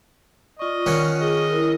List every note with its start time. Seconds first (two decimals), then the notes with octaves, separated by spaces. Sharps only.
0.59 F4 D5 D#5 C#6
0.86 D#3 C#4 F#5
1.21 G#4 D#5
1.50 E4 A#4